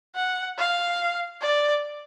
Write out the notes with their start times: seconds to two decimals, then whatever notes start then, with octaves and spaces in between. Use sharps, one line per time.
0.15 F#5
0.58 F5
1.41 D5